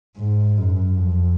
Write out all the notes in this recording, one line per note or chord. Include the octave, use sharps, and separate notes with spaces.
G#2
F#2
F2